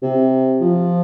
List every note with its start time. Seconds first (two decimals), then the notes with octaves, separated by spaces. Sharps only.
0.02 C3
0.61 F3